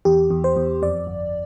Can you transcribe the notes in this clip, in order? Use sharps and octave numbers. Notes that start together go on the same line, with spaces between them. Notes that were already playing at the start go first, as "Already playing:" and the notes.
E2 G4
E2
C5
E2
F2 D5
G1